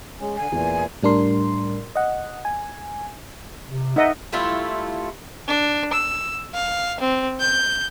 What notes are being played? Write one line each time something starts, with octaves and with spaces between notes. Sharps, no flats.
G#3 C#4
D3 G#5
E2 A#2 E3
A2 G3 D4 A#4 C6
D#5 F#5
G#5
C3
D#4 D#5 E5 F#5
G3 A3 E4 F4
D4
E6
F5
C4
G6